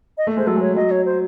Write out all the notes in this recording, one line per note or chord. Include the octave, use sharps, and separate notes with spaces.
D#5
A3
G#3 C5
F#3 A4
G#3
C#5
F#3 D#5
C#5
C5